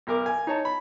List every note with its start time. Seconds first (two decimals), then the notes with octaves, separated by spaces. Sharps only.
0.07 B1 A#4 D6
0.26 G#5
0.47 D#4 C#5 A5
0.65 B5